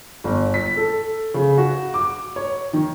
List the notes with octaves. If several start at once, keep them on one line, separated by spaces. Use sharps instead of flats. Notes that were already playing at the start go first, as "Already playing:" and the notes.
G1
B6
A4
C#3
F#4
D6
C#5
D#3